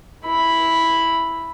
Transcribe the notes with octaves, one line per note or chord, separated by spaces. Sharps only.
E4 B5